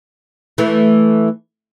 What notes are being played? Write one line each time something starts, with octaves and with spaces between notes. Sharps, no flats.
E3 A3